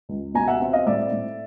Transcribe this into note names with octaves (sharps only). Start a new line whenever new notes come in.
C#2
B2 G#5 A#5
E5 F#5
C4
D#5 F5
A2 D5 E5
A2